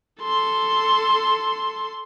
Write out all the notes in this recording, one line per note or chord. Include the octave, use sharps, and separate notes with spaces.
A4 C6